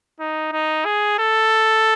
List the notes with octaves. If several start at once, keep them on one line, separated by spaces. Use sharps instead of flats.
D#4
D#4
G#4
A4